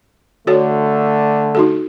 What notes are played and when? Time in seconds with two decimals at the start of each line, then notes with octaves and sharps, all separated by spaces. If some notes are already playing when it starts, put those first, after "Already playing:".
0.47 D3 A3 F#4 A4 C#5
1.55 D#4 F#4 A4